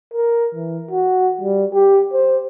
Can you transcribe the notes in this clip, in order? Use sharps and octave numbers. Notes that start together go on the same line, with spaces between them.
A#4
E3
F#4
G3
G4
C5